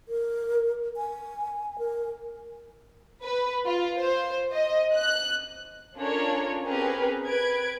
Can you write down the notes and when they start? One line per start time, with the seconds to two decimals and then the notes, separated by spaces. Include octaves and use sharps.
0.08 A#4
0.97 G#5
1.79 A#4
3.24 B4
3.66 F4
4.01 C5
4.54 D#5
4.96 F#6
5.96 C#4 D4 F4 A4 A#4 C#5
6.65 C4 C#4 G4 G#4 A#4 B4
7.26 B4 G#6 D7